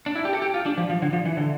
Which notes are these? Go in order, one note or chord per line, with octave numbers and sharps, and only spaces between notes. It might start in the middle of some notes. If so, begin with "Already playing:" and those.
D4
E4
G4
A4
G4
F4
D4
F3
F3
D3
F3
E3
D3